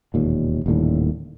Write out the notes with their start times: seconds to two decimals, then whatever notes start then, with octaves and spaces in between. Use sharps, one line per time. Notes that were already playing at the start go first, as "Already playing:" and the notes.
0.14 E1 D#2 A#2
0.66 D#1 D#2 A2 D3